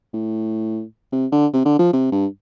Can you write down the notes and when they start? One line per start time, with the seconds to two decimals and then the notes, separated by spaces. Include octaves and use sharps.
0.13 A2
1.12 C3
1.32 D3
1.53 C3
1.65 D3
1.79 F3
1.93 C3
2.12 G2